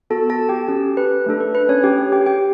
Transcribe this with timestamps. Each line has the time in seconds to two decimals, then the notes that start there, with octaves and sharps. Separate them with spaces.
0.10 B3 F#4 A4 A5
0.30 A4 A5
0.49 G4 G5
0.68 C#4 G4
0.97 B4
1.26 A3 D4 A4
1.40 B4
1.55 B4
1.69 C#4 C#5
1.84 C#4 G4 G5
2.12 G4 G5
2.26 G4 G5